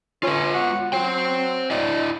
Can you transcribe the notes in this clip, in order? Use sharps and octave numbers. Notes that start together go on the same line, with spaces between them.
D3 C#4 F4 B4
B3 F#4
F#3 C5 G5
E4 D5 D#5